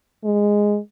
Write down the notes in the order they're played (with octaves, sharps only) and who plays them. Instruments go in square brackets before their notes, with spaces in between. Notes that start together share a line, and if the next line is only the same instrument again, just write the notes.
[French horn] G#3